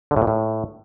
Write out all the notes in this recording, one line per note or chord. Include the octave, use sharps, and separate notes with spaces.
D3
A2
A#2
A2